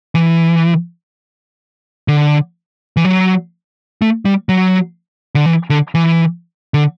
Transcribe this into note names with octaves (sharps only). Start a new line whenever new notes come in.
E3
D3
E3
F#3
A3
G3
F#3
D3
E3
D3
E3
D3